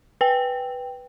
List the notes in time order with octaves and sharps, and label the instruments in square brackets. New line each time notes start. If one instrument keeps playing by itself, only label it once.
[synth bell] B4 G5